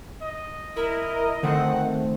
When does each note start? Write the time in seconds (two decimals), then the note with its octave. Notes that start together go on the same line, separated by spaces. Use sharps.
0.22 D#5
0.76 E4 A#4
1.43 D3 D#3 A3 C4 F#5